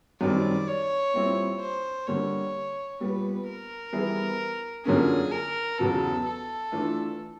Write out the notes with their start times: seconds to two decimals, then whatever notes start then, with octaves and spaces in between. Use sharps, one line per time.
0.21 F#2 D#3 G3 C4 D5
0.68 C#5
1.14 A#2 G3 C4 E4
1.60 C5
2.07 D3 G3 A#3 C#5
3.00 A#2 G3 B3 B4
3.47 A#4
3.93 E3 G3 B3 E4 G#4
4.85 F#2 D3 F3 A#3 C#4 G#4
5.31 A#4
5.79 E2 C#3 F#3 B3 A4
6.26 A4
6.72 E3 A3 D4 F4